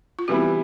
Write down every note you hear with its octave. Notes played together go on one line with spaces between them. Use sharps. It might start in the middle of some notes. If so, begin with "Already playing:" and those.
F4
C3 E3 G3 B3 E4 F#4